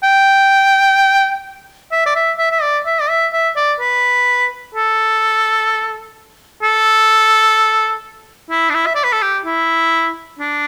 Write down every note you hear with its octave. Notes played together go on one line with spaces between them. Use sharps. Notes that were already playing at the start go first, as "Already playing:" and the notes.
G5
E5
D5
E5
E5
E5
D5
E5
D5
E5
E5
D5
B4
A4
A4
E4
D4
E4
E5
D5
B4
A4
G4
E4
D4